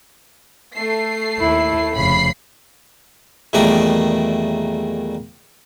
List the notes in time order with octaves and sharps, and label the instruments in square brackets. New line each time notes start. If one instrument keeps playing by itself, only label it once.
[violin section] A3 C7
[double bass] D#2 E4
[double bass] F1 C#3 [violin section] B5 C7
[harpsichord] E2 A#2 D#3 G3 A3 A#5